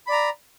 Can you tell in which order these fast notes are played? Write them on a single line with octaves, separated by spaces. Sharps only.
B5 D5 A#5